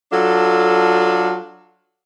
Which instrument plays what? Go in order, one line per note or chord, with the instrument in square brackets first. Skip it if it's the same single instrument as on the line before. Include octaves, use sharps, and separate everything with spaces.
[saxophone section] F#3 D4 F4 A4